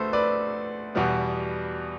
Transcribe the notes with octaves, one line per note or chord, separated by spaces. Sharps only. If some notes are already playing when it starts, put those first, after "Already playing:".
Already playing: D2 A3 A4 B4 C5
B4 D5
E2 B2 G3 B3